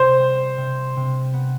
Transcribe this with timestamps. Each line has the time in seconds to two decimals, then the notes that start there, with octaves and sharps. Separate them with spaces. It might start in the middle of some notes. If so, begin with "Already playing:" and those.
Already playing: C3 B3 C5
0.19 G3
0.57 C3
0.96 C3
1.33 B3